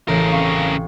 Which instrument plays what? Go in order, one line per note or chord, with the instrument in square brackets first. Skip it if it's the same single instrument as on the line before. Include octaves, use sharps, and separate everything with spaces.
[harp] A1 G6 A#6 [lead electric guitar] C#3 A#4
[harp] C4 F5 C#6